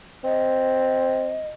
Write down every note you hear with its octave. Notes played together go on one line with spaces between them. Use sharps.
C4 D#5